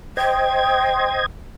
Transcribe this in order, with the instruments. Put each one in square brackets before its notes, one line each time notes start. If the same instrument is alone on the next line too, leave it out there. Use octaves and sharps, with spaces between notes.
[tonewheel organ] C5 D#5 G#6 [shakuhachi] G5